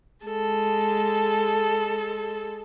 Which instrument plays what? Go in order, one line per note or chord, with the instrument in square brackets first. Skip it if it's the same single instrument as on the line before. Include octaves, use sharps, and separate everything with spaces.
[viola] G#3 A4